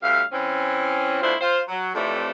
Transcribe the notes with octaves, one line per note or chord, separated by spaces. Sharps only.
D2 G3 E5 F5
E3 C4 C#4
D2 B2 D4 E4 F4 C5
F4 C5
F#3
F2 A2 C3 E3 A3 D5